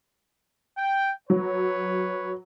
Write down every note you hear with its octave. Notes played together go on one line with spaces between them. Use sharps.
G5
F#3 B4 C#5